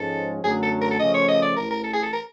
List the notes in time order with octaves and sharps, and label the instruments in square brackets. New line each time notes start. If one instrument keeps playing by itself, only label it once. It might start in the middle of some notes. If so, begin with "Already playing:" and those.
Already playing: [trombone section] G#2 F3 G#3 C#4 [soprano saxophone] A4
[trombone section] F#2 D3 F#3 A3 [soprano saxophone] G#4
[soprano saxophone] A4
A#4
A4
[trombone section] C#3 F3 A3 C#4 [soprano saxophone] D#5
[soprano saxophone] C#5
D#5
D5
[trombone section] A1 A2 E3 [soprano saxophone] A#4
[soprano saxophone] A#4
A4
G#4
A4
A#4